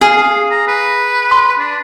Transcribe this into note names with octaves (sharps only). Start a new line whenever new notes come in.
G#4 F5
A#5
B4
C6
D4